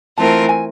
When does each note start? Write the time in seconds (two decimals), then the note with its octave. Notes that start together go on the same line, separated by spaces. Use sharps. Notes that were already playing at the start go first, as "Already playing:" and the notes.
0.18 E3 A3 C4 F4 A#4 A5
0.49 G#5